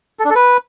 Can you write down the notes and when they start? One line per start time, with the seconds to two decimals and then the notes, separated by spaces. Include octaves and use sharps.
0.19 A4
0.25 D4
0.30 A4
0.35 B4